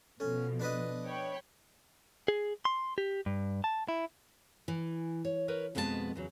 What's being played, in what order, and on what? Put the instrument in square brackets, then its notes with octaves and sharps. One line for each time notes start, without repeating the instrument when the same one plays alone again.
[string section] B2 F3 [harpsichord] C#4 [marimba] A4
[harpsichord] D4 B4 D#5
[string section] C#5 G5 B5
[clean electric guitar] G#4
C6
G4
G2
A5
E4
[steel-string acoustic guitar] E3
C#5
A#4 B4 C#5
F2 B2 G#3 B3 A4 A5
E2 C#3 F#3